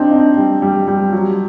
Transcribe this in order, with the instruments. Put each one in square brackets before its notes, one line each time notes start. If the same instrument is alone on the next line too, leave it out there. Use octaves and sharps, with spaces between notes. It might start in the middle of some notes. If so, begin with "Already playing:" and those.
Already playing: [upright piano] C4 D#4 [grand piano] D4
[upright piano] D#4
G3
G3
G3
F#3